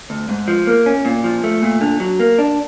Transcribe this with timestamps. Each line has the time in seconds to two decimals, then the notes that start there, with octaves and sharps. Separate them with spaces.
0.10 D2
0.29 G#2
0.48 F3
0.67 A#3
0.86 C#4
1.05 A#2
1.24 F3
1.44 A3
1.62 A#2
1.81 D3
2.00 F#3
2.20 A#3
2.38 D4